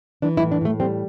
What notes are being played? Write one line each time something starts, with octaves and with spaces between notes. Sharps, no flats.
E3 D4
E4
A2
D4
A2 A3
G3 C4